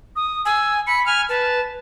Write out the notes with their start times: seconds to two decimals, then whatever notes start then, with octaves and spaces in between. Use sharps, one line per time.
0.16 D#6
0.45 G#5 E6
0.87 B5 C#7
1.06 G#5 F6
1.29 B4 A5